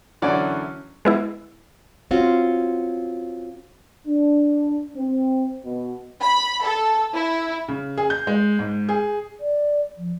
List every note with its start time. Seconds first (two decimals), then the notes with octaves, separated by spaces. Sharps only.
0.22 F#2 D3 E3 C#4 D5 F#5
1.05 G#3 B3 E4
2.11 C4 C#4 F4 F#4
4.07 D4
4.96 C4
5.65 B2
6.22 B5
6.65 A4
7.14 E4
7.68 C#3
7.98 G#4
8.10 G6
8.27 G#3
8.59 G#2
8.89 G#4
9.40 D5
9.97 F3